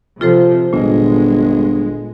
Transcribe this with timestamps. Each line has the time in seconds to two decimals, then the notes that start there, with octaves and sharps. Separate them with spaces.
0.21 C3 F3 F4 A4 C5
0.73 G1 A#2 G#3